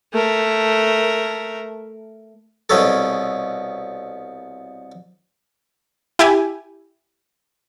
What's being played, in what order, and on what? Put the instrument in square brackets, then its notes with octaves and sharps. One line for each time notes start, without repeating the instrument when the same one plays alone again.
[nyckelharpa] A3 A#4
[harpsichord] C2 B2 C#4 A4
[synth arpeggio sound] E4 G4 G#5